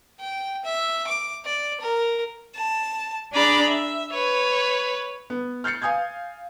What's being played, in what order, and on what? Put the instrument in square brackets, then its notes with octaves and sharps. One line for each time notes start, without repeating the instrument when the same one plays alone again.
[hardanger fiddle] G5
E5
D6
D5
A#4
[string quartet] A5
D4 G#4 D5 A#5 B5
E5
B4 C#5
[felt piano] B3
F6 G6 A6 C7 C#7
F5 G#5 D#6 G6 G#6